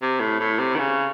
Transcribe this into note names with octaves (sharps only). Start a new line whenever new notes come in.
C3
A2
A2
C3
D#3
C#3